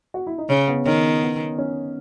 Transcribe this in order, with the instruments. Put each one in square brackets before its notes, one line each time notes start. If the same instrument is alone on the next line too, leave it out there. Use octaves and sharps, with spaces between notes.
[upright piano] F#4
E4
D#4
[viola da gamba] C#3 [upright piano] C#4
[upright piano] B3
[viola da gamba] D#3 [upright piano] C#4
[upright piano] B3
C#4